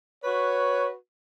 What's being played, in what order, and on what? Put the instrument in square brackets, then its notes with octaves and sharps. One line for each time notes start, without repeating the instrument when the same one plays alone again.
[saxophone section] F#4 B4 [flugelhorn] C#5